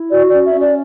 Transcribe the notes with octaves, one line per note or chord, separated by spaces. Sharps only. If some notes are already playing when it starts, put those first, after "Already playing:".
Already playing: E4
F#4 D5
D5
C#4
E5
C#4
D5